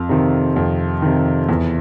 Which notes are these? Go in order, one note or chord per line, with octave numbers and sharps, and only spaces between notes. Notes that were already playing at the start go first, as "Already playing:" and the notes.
Already playing: F2
C3 D#3
F2
C3 D#3
E2